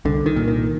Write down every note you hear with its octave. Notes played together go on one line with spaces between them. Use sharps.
C2 D3
D#3
A#2
D#3